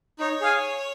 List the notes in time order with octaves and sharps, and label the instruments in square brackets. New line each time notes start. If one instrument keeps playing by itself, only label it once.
[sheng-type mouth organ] D#4 [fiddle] C#5
[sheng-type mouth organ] G#4 F5 G#5